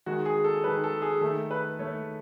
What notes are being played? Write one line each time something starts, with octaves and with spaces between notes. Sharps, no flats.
D#3 G#3 F#4
G#4
A4
D#3 G#3 B4
A4
G#4
D#3 A3 A4
B4
D#3 A3 C#5